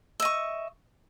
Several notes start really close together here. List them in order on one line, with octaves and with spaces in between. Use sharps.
E5 D#5 C#6